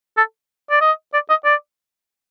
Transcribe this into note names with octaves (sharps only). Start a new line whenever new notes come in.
A4
D5
D#5
D5
D#5
D5